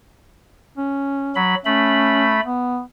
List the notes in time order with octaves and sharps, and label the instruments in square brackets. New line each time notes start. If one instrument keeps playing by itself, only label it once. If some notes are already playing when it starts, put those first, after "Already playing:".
[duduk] C#4
[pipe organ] F#3 B5
[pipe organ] A3 B5 [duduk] C#4
[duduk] B3